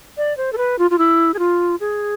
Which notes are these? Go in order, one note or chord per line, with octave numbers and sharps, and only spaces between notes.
D5
C5
A4
B4
F4
F4
E4
G#4
F4
G#4